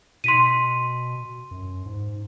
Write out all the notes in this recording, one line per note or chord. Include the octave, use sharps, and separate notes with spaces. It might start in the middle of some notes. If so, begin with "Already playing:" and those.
B2 C6 B6 D#7
F#2
G#2